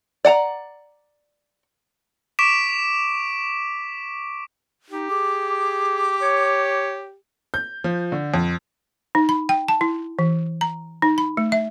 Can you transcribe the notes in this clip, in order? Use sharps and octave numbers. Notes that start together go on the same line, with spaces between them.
D5 F#5 A5 A#5
C#6 D6 B6 D7 E7
D#4 G4
G#4 D6
C#5
G6
F3
D3
F2
D#4
B5
G5
A5
E4
E3
A#5
D#4
B5
A3
E5